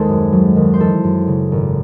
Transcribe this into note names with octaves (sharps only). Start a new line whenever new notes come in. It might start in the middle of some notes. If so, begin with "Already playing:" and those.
Already playing: D#2 G#3 A4 C5
F#2
F#3
D#2
C5
E3 A4
F#2
C#3
G#1